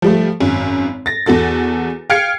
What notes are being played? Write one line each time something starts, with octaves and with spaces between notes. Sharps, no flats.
F3 G3 A3
G#1 F#2
A6 A#6
E2 F#4 A4 A6
F5 G5 F6 G#6 C7 C#7